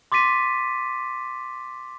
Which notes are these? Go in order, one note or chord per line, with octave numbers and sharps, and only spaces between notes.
C6 D6 A6 B6 D#7